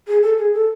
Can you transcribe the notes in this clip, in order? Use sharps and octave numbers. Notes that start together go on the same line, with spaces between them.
G#4
A4
G#4
A4